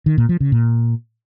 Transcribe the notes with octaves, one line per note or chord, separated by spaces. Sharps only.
D#3
A#2
F3
C#3
A#2